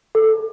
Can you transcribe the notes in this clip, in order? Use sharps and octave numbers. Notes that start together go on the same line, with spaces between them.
A4